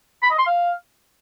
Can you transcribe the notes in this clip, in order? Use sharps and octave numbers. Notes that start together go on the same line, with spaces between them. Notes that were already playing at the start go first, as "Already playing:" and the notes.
B5
D#5
C6
F5